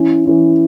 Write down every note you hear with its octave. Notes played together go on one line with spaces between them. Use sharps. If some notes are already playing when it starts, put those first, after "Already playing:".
Already playing: E3 C#4 E4
E3 C#4 E4